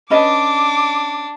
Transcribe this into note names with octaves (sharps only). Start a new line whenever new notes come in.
C#4 D4 B4 D#5 D6